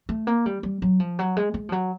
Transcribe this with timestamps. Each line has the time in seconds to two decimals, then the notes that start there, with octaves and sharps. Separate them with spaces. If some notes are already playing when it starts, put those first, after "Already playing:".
0.09 A3
0.27 A#3
0.46 G3
0.63 G3
0.82 F#3
1.00 F3
1.19 F#3
1.37 G#3
1.54 G#3
1.69 F3
1.72 F#3